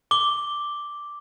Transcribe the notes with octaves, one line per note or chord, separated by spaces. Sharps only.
D6 G7